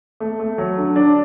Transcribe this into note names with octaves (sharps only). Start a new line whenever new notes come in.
A3
A3
F#3
D3
D4